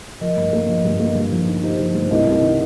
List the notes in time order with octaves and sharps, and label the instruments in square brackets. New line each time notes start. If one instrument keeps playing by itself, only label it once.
[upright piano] F3 [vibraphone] A#4 D#5
[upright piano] G2
A#3
F3
G2
A#3
G2
F3
D#4
[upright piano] D#4 [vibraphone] G4 C5
[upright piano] F3
G2
[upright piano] C2 [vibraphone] A#4 D#5
[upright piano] C2
D#3